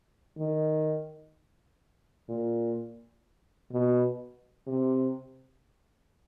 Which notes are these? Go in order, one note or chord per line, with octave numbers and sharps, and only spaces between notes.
D#3
A#2
B2
C3